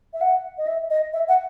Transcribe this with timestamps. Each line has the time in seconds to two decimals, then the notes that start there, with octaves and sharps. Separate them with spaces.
0.13 E5
0.21 F#5
0.58 D#5
0.67 E5
0.90 D#5
1.13 E5
1.28 F#5